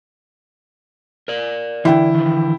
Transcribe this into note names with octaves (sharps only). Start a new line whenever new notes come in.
A#4 D5
D3 E3 E4 G5
D#3 F3